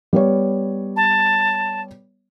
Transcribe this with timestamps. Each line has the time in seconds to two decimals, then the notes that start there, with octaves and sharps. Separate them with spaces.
0.13 G3 B3 C#5
0.96 A5